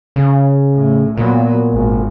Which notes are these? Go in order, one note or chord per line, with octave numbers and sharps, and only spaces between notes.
C#3
A2
A#2 F#3 B3
G#1